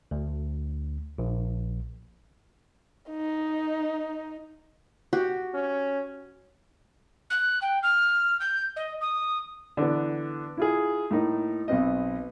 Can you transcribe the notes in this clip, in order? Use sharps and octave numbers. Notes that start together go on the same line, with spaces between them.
D2
A#1
D#4
F#4 G4
C#4
F#6
G5
F6
G6
D#5
D#6
D3 E3 B3
E4 F4 G#4
A2 A#3 D#4
B1 B3 C4 D#5